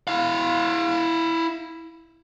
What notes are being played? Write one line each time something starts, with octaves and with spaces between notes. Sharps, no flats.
E4 F5